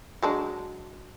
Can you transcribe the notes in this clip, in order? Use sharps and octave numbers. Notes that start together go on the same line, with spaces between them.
F#3 G#3 D4